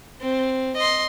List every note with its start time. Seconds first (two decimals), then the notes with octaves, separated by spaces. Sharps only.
0.22 C4
0.76 D#5 C6